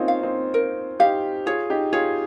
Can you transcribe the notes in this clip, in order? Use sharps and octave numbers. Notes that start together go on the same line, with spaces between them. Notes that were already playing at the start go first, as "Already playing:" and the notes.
Already playing: A#3 C4 C#4 D#4 F4
F5
C4 D#4
A#4
D#4 G4 F5
F4 G#4 C#5
D#4 G4
F4 G#4 C#5